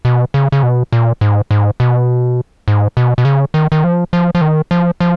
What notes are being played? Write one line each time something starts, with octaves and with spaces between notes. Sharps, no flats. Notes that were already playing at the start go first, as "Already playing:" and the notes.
B2
C#3
C#3
B2
A#2
G#2
G#2
B2
G#2
B2
B2
C#3
D#3
D#3
F3
F3
F3
D#3
F3
F3